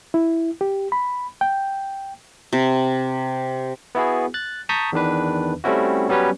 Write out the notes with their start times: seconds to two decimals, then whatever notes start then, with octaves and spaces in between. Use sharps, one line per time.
0.14 E4
0.61 G4
0.92 B5
1.41 G5
2.53 C3
3.95 B3 E4 F#4 G#4
4.34 F#6 A6
4.69 A5 A#5 C#6 D#6 G6 B6
4.93 E2 D#3 D4 B4
5.64 G3 A3 C4 C#4 E4 F#4
6.09 F#3 G3 B3 C#4 B4 C#5